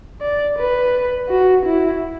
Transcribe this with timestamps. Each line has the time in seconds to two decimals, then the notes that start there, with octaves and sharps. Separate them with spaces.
0.22 D5
0.58 B4
1.29 F#4
1.65 E4